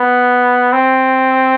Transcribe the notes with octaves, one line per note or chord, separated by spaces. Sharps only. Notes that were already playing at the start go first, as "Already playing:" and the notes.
Already playing: B3
C4